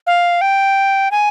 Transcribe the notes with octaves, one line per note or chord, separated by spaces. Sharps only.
F5
G5
G#5